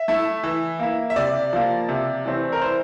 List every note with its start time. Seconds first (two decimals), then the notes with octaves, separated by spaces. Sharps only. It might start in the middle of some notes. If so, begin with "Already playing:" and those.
Already playing: E5
0.08 A3 E4
0.43 E3
0.79 A#3 E4
1.10 E5
1.16 C3 D5
1.53 F3 A#3
1.89 C3
2.25 E3 A3 C4
2.52 A#4
2.61 E3 C5